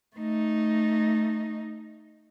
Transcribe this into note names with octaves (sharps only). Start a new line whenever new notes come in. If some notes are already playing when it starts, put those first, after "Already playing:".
A3 D#4